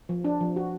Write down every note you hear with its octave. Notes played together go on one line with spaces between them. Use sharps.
F3
D4
F3
F#4